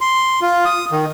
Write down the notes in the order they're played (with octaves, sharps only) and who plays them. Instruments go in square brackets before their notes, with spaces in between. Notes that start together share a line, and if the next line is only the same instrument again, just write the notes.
[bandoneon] C6
F4
D#6
D#3